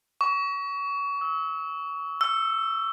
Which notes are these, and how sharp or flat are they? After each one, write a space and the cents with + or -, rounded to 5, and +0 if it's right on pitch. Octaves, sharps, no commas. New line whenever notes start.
C#6 +30
E6 -40
E6 +20